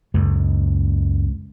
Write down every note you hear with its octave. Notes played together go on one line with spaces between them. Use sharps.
C#2 F#2